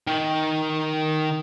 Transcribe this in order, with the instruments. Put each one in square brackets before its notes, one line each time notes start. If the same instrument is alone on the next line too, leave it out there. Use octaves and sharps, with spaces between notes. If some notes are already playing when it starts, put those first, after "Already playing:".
[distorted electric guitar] D#3 G5